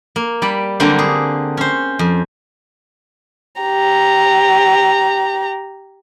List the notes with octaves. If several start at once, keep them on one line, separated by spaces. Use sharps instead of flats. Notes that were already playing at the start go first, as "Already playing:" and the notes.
A#3
G3 D5 B5
D3 F#3 G3 A#3 C4 D4
G#4
C#4 C5
F2
G4 A#5